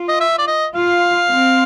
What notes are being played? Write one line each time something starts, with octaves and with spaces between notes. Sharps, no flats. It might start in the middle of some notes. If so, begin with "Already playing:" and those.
Already playing: F4
D#5
E5
D5
D#5
F4 F5
C4